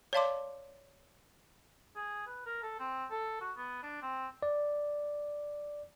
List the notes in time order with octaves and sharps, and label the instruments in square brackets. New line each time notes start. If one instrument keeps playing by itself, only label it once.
[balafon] C#5 D5 F5 A5 C6 D6
[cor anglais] G#4
B4
A#4
A4
C4
A4
F#4
B3
D4
C4
[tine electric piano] D5